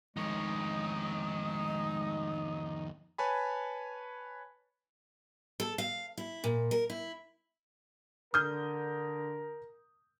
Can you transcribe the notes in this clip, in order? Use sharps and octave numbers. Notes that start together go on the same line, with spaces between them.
F2 D#3 G#3 D#4 C#5 D#6
B4 C#5 G#5 A5 B5
A4
F5
E4
A#2
A#4
E4
D3 A#4 D#6 F6 G6